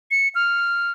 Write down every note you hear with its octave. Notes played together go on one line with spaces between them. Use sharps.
C#7
F6